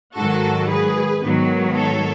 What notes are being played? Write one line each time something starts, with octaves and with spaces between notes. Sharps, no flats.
G#2 D#3 F#3 F#4 A4
G#4 B4
G#2 D#3 F#3 B3
A4 C#5